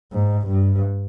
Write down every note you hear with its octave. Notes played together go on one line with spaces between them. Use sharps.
G#2
G2